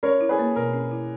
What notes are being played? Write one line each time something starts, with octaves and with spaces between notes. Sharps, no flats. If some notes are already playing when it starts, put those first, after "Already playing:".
C#4 A#4 C#5
E4
G#4 B4
A#3
B2 A#4
C#4
E4